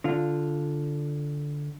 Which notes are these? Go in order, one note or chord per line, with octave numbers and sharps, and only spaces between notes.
D3 F4